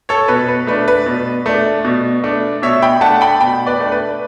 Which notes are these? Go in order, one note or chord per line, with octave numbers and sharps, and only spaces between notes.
A4 C#5
B2 B4
B4
A3 D4 B4
B4
B2
A3 D4
B2
A3 D4
B2 C#5 E5
G5 B5
A3 D4 F#5 A5
G5 B5
B2 G5 B5
B4 D5
A3 D4
B4